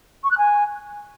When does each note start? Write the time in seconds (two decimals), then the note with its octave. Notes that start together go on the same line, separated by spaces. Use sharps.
0.23 C#6
0.30 F#6
0.38 G#5